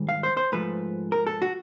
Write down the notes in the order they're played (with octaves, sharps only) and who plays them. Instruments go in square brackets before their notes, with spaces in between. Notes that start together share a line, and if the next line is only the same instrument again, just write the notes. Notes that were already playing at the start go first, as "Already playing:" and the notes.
Already playing: [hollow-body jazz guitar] G#2 D#3 G3
F5
C5
C5
G#2 F3 A3 B4
A#4
A4
F#4